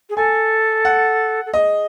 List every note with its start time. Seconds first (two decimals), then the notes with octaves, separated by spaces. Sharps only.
0.09 G#4
0.16 A4 G#5
0.85 F#5
1.46 A4
1.54 G#4 D#5